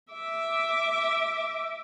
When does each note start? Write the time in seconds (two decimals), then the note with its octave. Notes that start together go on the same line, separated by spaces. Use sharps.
0.13 E5 D6